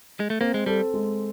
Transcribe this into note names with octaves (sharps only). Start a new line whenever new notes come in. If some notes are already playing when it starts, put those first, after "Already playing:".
G#3
A3
A#3 C4
G#3
G3 A4
G#3